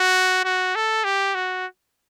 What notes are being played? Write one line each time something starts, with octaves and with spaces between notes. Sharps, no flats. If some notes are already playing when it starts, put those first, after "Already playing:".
Already playing: F#4
F#4
A4
G4
F#4